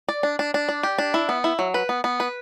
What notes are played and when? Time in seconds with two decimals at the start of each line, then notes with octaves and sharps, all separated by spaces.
0.08 D5
0.23 D4
0.39 D4
0.54 D4
0.69 D5
0.83 G4
0.98 D4
1.14 E4
1.29 B3
1.44 E4
1.59 F#3
1.74 B4
1.89 B3
2.04 B3
2.20 B4